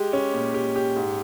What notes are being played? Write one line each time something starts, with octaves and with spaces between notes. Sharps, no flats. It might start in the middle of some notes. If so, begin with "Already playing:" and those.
Already playing: G#3 G4
C#4
A#2
G4
G4
G#2